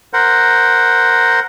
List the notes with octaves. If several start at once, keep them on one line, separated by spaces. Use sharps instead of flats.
A#4 C5 F#5